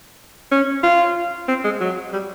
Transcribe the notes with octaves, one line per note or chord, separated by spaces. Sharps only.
C#4
F4
C4
G#3
F#3
G3